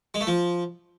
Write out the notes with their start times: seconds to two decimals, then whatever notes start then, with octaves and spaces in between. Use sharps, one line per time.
0.14 G#3
0.21 A3
0.27 F3